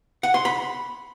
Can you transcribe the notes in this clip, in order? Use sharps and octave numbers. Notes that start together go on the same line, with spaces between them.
F#5
C6
B5